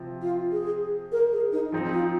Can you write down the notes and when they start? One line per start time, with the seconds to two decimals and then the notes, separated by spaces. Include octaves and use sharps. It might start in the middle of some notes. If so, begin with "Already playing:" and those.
Already playing: C3 F3 C4
0.22 F4
0.52 G#4
1.12 A#4
1.33 G#4
1.52 D#4
1.72 F3 C4 D#4
1.93 F4